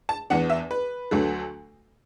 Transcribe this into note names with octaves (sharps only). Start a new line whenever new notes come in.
A5
E2 E3 B3 D4 F#5
E5
B4
D2 D3 F#3 A3